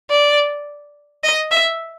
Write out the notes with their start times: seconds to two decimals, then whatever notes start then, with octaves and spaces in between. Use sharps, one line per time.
0.10 D5
1.23 D#5
1.51 E5